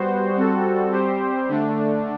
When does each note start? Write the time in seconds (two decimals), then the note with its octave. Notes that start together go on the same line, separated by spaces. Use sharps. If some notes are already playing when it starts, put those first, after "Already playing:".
Already playing: G3 B3 F#4 C5
0.36 G3 C4 F#4 A4
0.92 G3 C4 G4 C5
1.49 D3 A3 D4